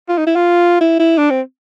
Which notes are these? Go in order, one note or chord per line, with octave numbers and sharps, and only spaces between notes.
F4
D#4
E4
F4
E4
E4
D4
C4